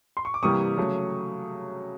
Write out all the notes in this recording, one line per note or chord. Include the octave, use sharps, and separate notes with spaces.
C6
C#6
D6
C3 E3 G3 A#3 C#6 D#6
C#3 F#3 A3